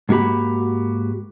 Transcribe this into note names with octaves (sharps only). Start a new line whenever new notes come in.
G#2 A#3 F#4 G4 B5